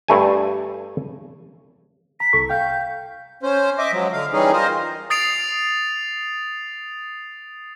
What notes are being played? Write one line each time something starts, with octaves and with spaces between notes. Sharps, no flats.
G2 A3 G#5
A#5 B6
C2 A4 C#6
F5 G5 G6
C#4 C5
D#5 E5 D6
F3 F#3 G#3
D3 F5
E3 G3 C#4 D#4 G#4
F4 A#4 C5 D#5
D#6 A6 C7 D7 F7